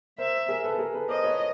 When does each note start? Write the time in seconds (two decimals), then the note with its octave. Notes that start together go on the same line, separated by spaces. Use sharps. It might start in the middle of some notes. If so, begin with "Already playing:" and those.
0.18 A#4 C5 E5
0.48 G#4 A#4
0.64 A4 B4
0.75 A4
0.78 G#4 A#4
0.94 A4 B4
1.09 A#4 C5 D#5
1.24 B4 C#5